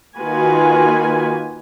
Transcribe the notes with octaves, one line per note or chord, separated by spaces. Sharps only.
D#3 A#3 F4 F#4 B4 G#5